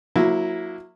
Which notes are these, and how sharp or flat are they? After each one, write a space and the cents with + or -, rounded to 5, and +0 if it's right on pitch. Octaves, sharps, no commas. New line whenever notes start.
F#3 -20 A#3 +0 E4 +0